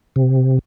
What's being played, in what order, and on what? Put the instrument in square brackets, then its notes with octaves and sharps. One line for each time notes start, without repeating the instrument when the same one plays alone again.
[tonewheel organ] C3